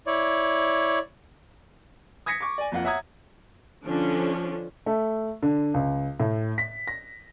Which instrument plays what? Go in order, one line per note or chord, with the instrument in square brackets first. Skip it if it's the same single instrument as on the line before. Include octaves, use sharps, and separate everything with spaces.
[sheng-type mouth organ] E4 C#5 D5
[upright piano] D#6 G#6 A#6 B6 C#7
C#6 D6
D5 G#5
F2 A#3 F4 F#5
C#5 E5 F#5 A#5 D#6 G#6
[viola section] D3 F3 C#4 D4
[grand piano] A3
D3
C#2
A2
B6
A#6